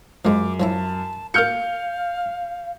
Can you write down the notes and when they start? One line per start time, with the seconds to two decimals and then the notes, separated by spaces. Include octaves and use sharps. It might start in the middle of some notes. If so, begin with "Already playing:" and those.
0.25 F#2 F3 G#3 D6
0.60 F3 F#3 E4 A5
1.34 A#3 F#4 F5 F6 G6 C#7